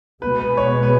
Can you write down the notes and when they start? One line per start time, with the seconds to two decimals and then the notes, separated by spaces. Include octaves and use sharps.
0.22 B2 G#3 B3 B4
0.39 B4
0.57 C#5
0.83 B4